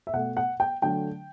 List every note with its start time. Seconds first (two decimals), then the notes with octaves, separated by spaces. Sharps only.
0.07 E5
0.13 B2 A3 F#5
0.37 F#5
0.60 G5
0.82 D3 F#3 A3 G5